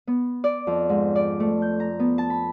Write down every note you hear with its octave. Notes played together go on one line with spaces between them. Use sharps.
B3
D5
F2
G#2
D5
A3
G6
A#5
B3
A5
B5